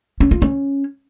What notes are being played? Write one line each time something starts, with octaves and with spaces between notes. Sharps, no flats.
C#4
F4
C#4